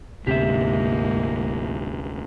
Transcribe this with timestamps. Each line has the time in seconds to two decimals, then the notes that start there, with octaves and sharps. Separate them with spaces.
0.27 D2 G#2 C3 A#3 G4 E5